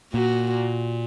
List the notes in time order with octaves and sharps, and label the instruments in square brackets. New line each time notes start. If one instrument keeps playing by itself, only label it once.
[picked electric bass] A#2 [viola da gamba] F#4